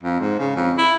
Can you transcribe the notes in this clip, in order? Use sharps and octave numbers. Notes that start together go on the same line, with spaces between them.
F2
G#2
C#3
F2
E4